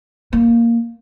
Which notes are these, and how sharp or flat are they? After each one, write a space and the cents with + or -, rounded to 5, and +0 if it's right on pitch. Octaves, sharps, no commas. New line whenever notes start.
A#3 -5